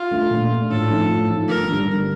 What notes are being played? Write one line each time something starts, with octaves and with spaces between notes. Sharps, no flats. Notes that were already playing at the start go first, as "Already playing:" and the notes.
Already playing: F4
A3 D4
A#2
A3 D4
A2 A4
F3 A3 D#4
A2
F3 A3 D#4
G1 A#4
G2 D3 G3 D4
G1